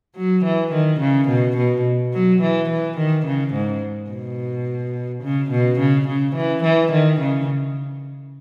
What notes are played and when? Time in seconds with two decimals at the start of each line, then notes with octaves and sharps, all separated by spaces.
0.16 F#3
0.45 E3
0.72 D#3
1.00 C#3
1.29 B2
1.57 B2
2.13 F#3
2.42 E3
2.70 E3
2.97 D#3
3.26 C#3
3.54 G#2
4.10 B2
5.23 C#3
5.51 B2
5.79 C#3
6.08 C#3
6.35 E3
6.64 E3
6.92 D#3
7.20 C#3